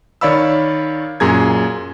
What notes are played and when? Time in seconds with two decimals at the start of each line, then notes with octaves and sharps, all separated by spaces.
0.21 D#3 C#5 D5 F5 B5 E6
1.20 F#2 A#2 G#4 A#5 G#6